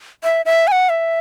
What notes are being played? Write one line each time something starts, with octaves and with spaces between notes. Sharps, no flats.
E5
E5
G#5
F#5
E5